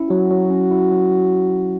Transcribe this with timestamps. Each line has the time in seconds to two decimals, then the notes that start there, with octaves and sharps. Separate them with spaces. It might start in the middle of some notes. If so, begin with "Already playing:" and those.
Already playing: C#4 E4
0.10 F#3 F#4
0.31 F#3
0.51 C#4
0.71 E4
0.92 F#3
1.12 F#3